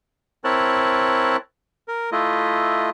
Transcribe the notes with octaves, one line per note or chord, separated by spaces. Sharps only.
C4 E4 A#4 C#5 A5 F#6
A#4
A3 E4 F4 D#5